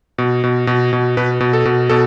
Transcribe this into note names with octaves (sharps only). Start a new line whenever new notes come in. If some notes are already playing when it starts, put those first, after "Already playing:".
B2
B2
B2
B2
B2 B4
B2
A4
B2
B2 A4